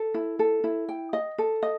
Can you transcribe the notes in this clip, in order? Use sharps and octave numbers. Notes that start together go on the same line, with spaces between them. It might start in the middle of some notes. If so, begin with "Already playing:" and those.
Already playing: A4
E4
A4
E4
G5
D#5
A4
D#5